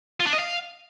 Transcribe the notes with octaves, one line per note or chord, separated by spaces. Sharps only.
F4
D4
D#5
F5